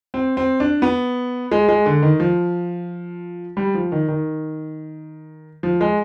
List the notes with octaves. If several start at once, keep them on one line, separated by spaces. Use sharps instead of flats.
C4
C4
D4
B3
G#3
G#3
D3
D#3
F3
G3
F3
D#3
D#3
F3
G#3